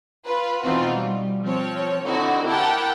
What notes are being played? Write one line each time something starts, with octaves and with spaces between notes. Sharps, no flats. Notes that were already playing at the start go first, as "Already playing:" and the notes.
F4 B4
B2 E3 C4 D#4 F4 F#4
G3
F3 C4 C#5
D3 C4 D#4 E4 F#4
E4 G4 A#4 F#5 G5 A5